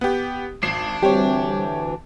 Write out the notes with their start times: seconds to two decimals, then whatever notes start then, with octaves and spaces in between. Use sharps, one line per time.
0.01 B3 G4
0.63 G#1 D4 C7 E7
1.03 D2 E3 G3 C4 G4 C#5